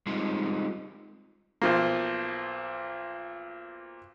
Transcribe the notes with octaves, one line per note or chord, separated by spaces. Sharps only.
G3 G#3 C4 D#4 F4
B1 F3 A#3